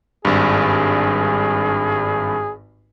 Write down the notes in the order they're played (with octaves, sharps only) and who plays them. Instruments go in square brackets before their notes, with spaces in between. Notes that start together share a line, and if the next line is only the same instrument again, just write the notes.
[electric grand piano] G#1 G2 [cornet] G#4